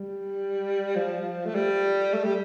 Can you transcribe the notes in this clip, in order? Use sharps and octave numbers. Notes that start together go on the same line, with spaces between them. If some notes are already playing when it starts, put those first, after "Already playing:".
Already playing: G3
F3
A3
G3
A3
G3